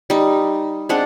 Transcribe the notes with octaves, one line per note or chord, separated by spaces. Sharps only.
G3 D#4
G#3 C4 D4 F#5